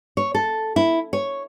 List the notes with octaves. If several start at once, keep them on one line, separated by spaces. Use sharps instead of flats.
C#5
A4
E4
C#5